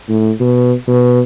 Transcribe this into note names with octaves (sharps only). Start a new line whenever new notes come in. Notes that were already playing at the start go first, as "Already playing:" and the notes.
A2
B2
B2